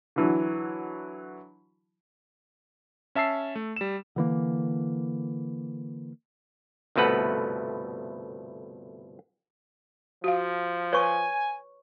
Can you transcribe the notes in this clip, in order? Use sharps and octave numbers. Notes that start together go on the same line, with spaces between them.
D3 E3 F#3
C#4 E5 A5 E6 C7
A3
G3 E7
D3 E3 A#3
G1 C2 B2 A3 B4 F#5
F3 F#4 F5
B4 C#5 G#5 C#6